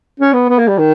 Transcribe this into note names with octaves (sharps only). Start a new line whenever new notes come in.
C#4
B3
B3
A#3
G3
D#3